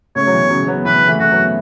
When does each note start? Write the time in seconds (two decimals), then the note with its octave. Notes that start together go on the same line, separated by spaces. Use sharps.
0.16 A2 C#3 C#5
0.27 F#3
0.33 B2 E3
0.50 C#3 F#3
0.67 F#3 B3
0.85 B2 E3 B4
1.08 E3 A3
1.19 A3 F#4
1.32 F#3 B3